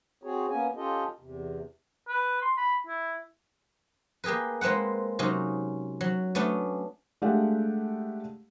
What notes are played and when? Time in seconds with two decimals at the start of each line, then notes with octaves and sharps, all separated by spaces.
0.23 C4 F#4 G#4 C#5
0.49 A#3 B3 C#4 G#5
0.76 C#4 F4 G4 A4 D#5
1.20 E2 C3
2.08 B4
2.42 C6
2.57 B5
2.87 E4
4.24 A#3 G4 G#4 A#4 B4
4.61 G#3 A#3 C4 B4 F#5
5.19 C3 F#3 C#4 D#4
6.01 F#3
6.35 A3 B3 C#4 D4
7.22 G#3 A3 D4 G4 F5 F#5